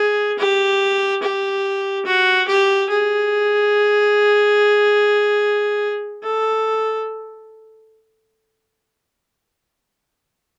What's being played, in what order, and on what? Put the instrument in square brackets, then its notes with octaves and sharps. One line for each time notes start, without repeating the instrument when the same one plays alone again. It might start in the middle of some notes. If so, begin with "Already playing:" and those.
Already playing: [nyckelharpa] G#4
G4
G4
F#4
G4
G#4
A4